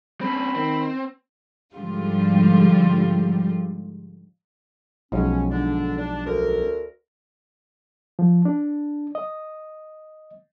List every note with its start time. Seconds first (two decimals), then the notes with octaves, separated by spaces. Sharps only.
0.21 C4 C#4 B5
0.55 D#3 C4
1.75 G#2 D3 F3 G3 F4
5.12 B1 F3 G#3 C#4
5.50 D3 D4
5.97 D4
6.26 D2 A#4
8.19 F3
8.45 D4
9.15 D#5